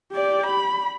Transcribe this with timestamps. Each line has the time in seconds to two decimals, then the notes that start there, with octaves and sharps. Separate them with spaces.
0.13 G4 D5
0.46 B5